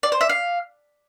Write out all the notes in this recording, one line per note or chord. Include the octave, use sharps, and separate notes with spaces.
D5
C5
E5
F5